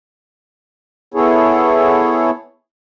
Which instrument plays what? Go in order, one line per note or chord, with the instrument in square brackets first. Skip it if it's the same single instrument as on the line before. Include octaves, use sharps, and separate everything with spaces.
[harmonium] B3 E4 G#4 A4 C#5